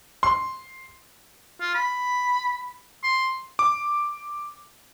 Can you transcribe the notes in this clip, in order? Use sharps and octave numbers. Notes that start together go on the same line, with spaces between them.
C6
F4
B5
C6
D6